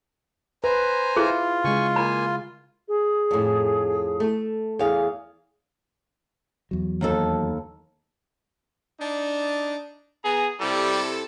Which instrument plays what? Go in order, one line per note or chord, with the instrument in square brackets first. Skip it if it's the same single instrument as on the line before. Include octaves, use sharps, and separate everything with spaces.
[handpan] B4 [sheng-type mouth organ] C5 G#5 A#5
[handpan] E4 [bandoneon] F4 [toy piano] G#4
[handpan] C#3 G#3 [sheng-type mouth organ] G#5 C#6
[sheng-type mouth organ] A#3 G#5 [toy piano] B5
[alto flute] G#4
[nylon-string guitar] F2 A2
A3
[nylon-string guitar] E2 F5 [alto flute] G#4
[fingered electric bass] E2 F#3
[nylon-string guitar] D#2 D#4 A4
[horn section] D4 D#4
[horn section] B3 A#5 [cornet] G#4
[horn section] C3 E4 A4 [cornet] G3